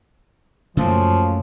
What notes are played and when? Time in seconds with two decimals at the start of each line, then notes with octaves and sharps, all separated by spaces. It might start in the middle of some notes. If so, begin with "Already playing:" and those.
0.77 F#2 C#3 F3 A3 A#3